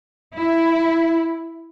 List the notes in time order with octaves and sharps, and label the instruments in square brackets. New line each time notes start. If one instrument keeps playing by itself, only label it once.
[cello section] E4